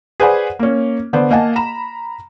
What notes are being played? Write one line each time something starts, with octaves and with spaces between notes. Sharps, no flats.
G#4 B4 C5 D5 F#5 G#5
A#3 C#4
D3 B3 C5 D5
A#3 D#5 F5 F#5 G#5 A5
A#5 B5 E7